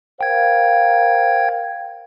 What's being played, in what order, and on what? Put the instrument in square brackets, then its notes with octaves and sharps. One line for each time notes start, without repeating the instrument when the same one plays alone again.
[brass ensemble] A#4 C5 F5 [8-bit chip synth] G5 G#6